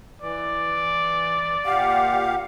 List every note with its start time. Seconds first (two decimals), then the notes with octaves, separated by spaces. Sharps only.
0.22 E3 D5
1.66 A#2 G4 F5 F#5